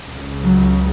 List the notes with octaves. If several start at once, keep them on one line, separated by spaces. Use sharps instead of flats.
C#2 C#3
F#3